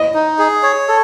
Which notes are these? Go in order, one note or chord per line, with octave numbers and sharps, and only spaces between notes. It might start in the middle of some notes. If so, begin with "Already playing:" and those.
Already playing: D#5
D#4
G#4
C#5
A4